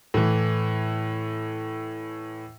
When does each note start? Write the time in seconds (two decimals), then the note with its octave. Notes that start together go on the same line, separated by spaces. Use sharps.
0.14 A2 E3